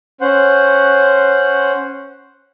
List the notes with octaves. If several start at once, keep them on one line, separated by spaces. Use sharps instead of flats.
C#4 C5 F#5